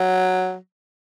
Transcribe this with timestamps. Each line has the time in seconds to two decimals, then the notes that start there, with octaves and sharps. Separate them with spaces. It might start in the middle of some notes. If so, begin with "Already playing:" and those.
Already playing: F#3